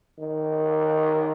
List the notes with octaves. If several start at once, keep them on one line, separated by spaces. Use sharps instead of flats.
D#3